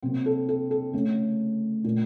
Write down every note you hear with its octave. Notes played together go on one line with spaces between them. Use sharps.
C3 F#3 A#3 C4
A4
A4
A4
C#3 A3
A#2 A3